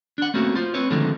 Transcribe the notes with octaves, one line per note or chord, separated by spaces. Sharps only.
D4 F#5
A3 A#3 C4 C#4 F#4
F4 C5
C4 B4 C#5
D3 D#3 F3 G#3 A3 C4